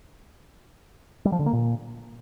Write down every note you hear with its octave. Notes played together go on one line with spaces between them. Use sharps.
G3
F3
D3
A#3
A#2